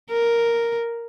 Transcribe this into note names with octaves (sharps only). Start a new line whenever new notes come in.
A#4